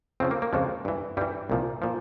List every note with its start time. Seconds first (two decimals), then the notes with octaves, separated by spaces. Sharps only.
0.20 F2 C#3 F3 C4
0.31 A#3
0.42 A#3
0.53 F2 C#3 F3 G#3
0.85 G2 E3
1.17 G2 E3 G3
1.50 C2 A#2 F3
1.82 A#2 F3